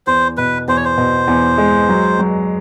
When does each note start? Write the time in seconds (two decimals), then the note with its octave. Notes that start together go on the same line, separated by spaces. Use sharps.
0.07 E2 C5
0.37 B2 B4
0.68 E2 C5
0.76 C#5
0.85 C5
0.98 B2
1.27 E2
1.58 G#3
1.89 F#3
2.19 F#3